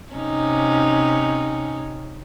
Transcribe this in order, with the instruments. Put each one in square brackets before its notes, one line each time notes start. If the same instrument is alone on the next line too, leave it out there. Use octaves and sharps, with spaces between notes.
[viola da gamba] C3 C#4 D#4